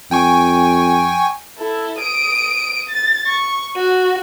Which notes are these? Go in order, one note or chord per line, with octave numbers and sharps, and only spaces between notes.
F2 G5 G#5 C#6
E4 A4
D#6 D7
A6
C#6
F#4